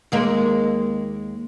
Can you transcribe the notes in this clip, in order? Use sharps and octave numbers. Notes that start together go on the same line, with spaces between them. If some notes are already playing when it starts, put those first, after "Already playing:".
D#2 G#3 A#3